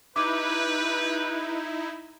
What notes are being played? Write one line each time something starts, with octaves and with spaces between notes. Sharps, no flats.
D#4 E4 G4 B4 D6